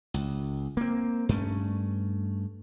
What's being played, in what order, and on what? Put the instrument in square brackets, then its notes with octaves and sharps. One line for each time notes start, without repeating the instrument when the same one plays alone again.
[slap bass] C#2
A#3 C4
G2 A3 C#4